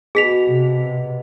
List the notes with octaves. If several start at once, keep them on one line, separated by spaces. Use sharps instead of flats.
B2 G#4 B6 F7
C3